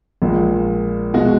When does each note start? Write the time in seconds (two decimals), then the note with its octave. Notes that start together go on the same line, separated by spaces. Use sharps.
0.22 A#1 A#2 G#3
1.14 B2 G#3 F#4